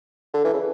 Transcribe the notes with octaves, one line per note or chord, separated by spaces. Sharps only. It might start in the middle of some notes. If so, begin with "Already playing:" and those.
D3
E3
C#3